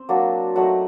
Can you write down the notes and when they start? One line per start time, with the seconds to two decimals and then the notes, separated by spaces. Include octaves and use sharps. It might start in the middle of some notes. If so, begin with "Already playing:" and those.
Already playing: C4
0.09 F#3 A#3 D4
0.56 F#3 A3 D#4 F#5